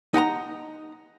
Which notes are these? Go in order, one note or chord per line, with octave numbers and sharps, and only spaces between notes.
D#4 F#5 G#5 A#5